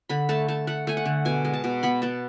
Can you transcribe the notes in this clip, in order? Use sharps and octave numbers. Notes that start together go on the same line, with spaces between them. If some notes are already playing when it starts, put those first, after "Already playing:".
D3 B5
A3 A5
A3 A5
A3 F#5
A3 G#5
F#5
D3
B2 G#5
G#3
A5
B2
B3 B5
B3 A5